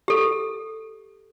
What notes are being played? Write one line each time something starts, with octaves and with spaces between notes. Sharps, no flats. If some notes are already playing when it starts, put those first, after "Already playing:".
G4 A4